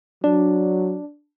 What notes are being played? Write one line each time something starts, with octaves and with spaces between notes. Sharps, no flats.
F#3 D4